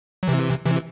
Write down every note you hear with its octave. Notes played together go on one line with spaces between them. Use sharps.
F#3
C3 E3
C3 E3